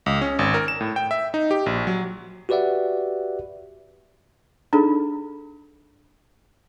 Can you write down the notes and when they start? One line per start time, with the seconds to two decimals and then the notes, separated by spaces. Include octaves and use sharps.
0.06 C#2
0.21 C#4
0.39 G#1
0.54 A#4
0.68 E7
0.81 A2
0.96 G5
1.11 E5
1.34 D#4
1.51 G4
1.66 A#1
1.87 F#3
2.49 F#4 G4 B4 D5 E5 F#5
4.73 D4 D#4 G#4 A4 B5